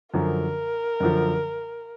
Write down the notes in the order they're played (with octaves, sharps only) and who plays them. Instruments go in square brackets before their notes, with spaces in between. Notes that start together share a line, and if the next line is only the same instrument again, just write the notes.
[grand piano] F#2 D3 F3 [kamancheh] A#4
[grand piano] F#2 D3 F3